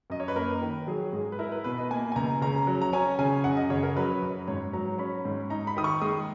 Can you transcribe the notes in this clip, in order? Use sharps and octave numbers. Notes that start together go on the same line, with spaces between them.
F#2 D#5
C#5
B4
A#3 A#4
D#3
F#3 G#4
G#2 G#4
B4
E4 A#4
B4
B2 B4
D#5
A#3 G#5
G#5
C#2 A#5
C#3 A#5
F#3
A#5
C#4 G#5
C#3 G#5
F#2 F#5
D#5
C#3 C#5
A#4
F#3 B4
F#2
G#2 C#5
F#3 A#5
C#4 B5
G#2
D#4 A#5
B5
D#3 D#6
C#6
G#3 D#6